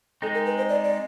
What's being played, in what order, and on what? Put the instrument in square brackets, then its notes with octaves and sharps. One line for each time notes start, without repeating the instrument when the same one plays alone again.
[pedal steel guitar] G#3 C4 D#4 [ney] A4
[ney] A#4
B4
C5
D5
D5